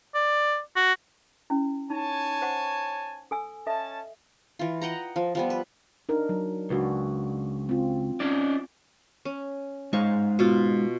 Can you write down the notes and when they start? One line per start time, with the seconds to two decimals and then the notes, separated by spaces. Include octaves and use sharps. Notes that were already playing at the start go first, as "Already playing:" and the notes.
0.15 D5
0.76 F#4
1.50 C#4 E4
1.90 D#4 C#5 G#5 A5
2.42 C5 F#5 C#6
3.31 A4 G#5 E6
3.67 C#4 A4 D#5 E5 A5
4.59 E3 F4
4.82 D#5 F#5 G5 A#5
5.16 F3
5.35 F3 G3 B3
5.50 B4
6.09 D4 D#4 A#4
6.29 F#3
6.70 C#2 D4 F#4 B4
7.69 C4 F4
8.20 C#4 D#4 D5
9.25 C#4
9.93 G#3 D#4 C5 F5 C#6
10.39 B2 F4